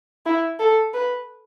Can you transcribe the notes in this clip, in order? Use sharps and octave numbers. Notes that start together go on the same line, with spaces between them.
E4
A4
B4